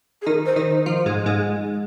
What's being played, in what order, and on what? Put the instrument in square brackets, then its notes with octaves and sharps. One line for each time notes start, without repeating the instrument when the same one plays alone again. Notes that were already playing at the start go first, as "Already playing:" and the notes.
[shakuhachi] G#4
[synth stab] D#3 D#4 [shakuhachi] A#4
[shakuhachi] C5
[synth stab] D#3 D#4
[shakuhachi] C5
[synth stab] F3 F4
G#2 G#3
G#2 G#3